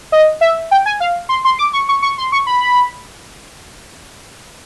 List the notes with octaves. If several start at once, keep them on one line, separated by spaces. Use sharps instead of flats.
D#5
E5
G5
G#5
F5
C6
C6
D6
C#6
C#6
C#6
C6
C#6
B5